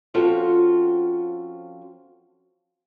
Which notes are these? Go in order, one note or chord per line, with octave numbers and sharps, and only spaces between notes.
F3 C4 C#4 F4 F#4 A4